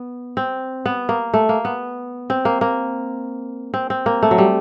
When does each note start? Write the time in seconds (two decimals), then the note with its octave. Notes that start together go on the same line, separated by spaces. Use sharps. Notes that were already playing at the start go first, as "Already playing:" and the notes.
Already playing: B3
0.37 C4
0.85 B3
1.09 A#3
1.34 A3
1.49 A#3
1.65 B3
2.30 C4
2.45 A#3
2.61 A#3
3.74 C4
3.90 C4
4.06 A#3
4.23 A3
4.31 F#3
4.38 G3